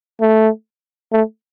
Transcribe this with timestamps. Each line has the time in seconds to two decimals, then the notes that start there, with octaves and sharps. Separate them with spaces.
0.21 A3
1.12 A3